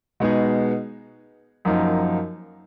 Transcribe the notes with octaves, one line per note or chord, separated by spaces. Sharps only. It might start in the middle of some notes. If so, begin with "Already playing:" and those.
B2 G#3 B3 D#4 G#4
F#2 F3 A#3 D#4